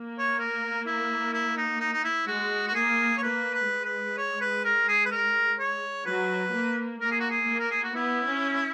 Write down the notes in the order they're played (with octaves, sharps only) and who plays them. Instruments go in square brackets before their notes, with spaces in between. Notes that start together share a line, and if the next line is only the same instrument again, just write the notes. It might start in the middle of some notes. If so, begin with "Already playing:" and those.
Already playing: [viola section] A#3
[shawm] C#5
A#4
E4
E4
D#4
D#4
D#4
E4
[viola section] G#3 [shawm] F#4
[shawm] F#4
[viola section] A#3 [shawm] G#4
[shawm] C#5
[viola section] A#3 [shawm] B4
[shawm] B4
[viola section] G#3
[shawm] B4
C#5
B4
A#4
G#4
B4
A#4
C#5
[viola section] F#3 [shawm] B4
[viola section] A#3
[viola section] A#3 [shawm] A#4
[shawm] G#4
F#4
G#4
[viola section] A#3
[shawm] A#4
G#4
F#4
[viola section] B3 [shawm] E4
[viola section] C#4